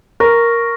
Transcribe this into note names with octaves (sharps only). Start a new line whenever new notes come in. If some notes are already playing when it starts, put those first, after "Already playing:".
A#4 C#6 F6 A#6